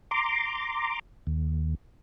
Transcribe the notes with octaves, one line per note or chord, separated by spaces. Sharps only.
A#5 C6 D6
D#2